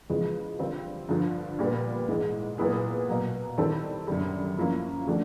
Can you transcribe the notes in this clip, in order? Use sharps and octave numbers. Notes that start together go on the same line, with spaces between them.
E2 C#3 F3 G#3
D3 G3 C4 F4
G2 D3 F3
A#2 G3 B3
G#2 E3 G#3
A#2 F#3 B3 E4 G#4
B2 F#3 A#3
D#3 G3 C4 E4 A4
F#2 D3 G3
A2 F3 A#3 C#4 E4
D3 F3 A3 D4 F#4